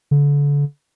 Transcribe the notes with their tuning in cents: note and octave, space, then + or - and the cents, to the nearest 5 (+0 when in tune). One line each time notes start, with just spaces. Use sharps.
D3 -35